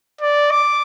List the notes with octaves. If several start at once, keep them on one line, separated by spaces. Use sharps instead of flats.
D5
D6